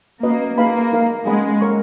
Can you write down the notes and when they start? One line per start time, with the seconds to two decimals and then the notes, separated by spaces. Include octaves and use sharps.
0.23 A#3 C#4 F#4 B4 D#5
0.58 A#3 D#4 G#4 B4 F5 B5
0.92 D#4 A#4 F5
1.27 G#3 C#4 G#4 D#5 F#5 B5
1.61 A#4 C#5 F#5 C#6